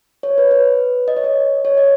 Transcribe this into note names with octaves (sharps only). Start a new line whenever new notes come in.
C#5
B4
B4
D#5
C#5
D#5
C#5
D#5